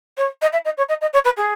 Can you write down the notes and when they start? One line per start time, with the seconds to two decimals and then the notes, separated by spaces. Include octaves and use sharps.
0.17 C#5
0.42 D#5
0.53 E5
0.65 D#5
0.78 C#5
0.89 D#5
1.01 D#5
1.13 C#5
1.25 B4
1.37 G#4